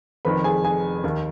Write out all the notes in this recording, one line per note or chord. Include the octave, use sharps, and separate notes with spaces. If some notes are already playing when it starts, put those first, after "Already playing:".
F1 F2 D#3 B4 B5
G#4 G#5
G#4 G#5
D#2 D#3